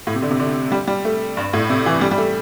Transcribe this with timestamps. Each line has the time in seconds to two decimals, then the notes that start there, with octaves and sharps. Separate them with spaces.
0.07 A2
0.15 C3
0.22 D3
0.31 C3
0.40 D3
0.72 G3
0.88 G3
1.05 A3
1.37 G2
1.53 A2
1.70 C3
1.86 E3
2.01 G3
2.11 G3
2.18 A3